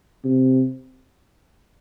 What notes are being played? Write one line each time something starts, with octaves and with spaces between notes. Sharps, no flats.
C3